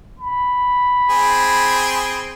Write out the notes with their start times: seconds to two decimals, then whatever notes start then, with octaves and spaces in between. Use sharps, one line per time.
0.19 B5
1.09 C4 G#4